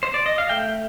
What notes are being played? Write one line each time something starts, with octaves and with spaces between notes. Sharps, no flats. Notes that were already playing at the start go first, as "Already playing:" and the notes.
C5
D5
D#5
F5
A3 G5